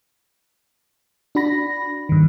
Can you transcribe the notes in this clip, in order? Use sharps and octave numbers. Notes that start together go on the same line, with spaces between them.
D4 F#4 B5 A#6
G2 D#3